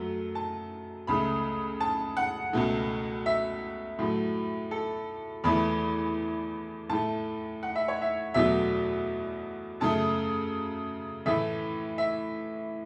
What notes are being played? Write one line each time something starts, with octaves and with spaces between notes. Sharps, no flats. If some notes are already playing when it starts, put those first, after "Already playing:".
Already playing: F#2 F#3 A3
A5
C#2 C#3 A3 B5
A5
F#5
C#2 B2 A3
E5
A2 F#3 A3
A4
E2 E3 A3 B5
A2 A3 A5
F#5
E5
C#5
E5
E2 B2 F#3 A3 E5
F#2 C#3 A3 A5
A2 E3 A3 E5
E5